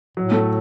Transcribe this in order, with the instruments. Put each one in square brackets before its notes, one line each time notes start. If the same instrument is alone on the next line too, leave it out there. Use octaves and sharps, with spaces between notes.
[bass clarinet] A2 [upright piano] F#3
[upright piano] A3